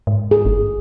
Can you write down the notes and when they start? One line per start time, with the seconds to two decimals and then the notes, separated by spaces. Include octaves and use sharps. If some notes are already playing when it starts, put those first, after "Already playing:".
0.07 G#2
0.31 G#4
0.45 G1